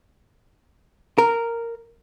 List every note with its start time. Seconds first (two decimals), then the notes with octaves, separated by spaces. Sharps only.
1.18 A#4